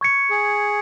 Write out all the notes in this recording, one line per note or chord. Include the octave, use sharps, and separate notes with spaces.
C#6 G#6 C#7
G#4